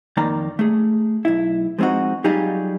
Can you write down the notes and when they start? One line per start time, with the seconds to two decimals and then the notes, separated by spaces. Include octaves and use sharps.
0.17 F2 D#3 A#3 D5 A#5
0.59 A3 G#4
1.25 B1 E4
1.79 F3 G#3 C4 D#4 F#4
2.24 F#3 G3 D#4 F4 G4 G#4